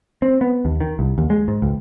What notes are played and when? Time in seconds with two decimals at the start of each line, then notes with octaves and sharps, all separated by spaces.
0.22 C4
0.41 B3
0.65 D#2
0.80 D#3
0.99 C2
1.18 D#2
1.30 G#3
1.48 G#2
1.62 C#2